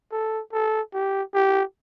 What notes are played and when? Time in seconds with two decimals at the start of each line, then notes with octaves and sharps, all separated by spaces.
0.12 A4
0.53 A4
0.94 G4
1.34 G4